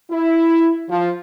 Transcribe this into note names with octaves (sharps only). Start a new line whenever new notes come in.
E4
F3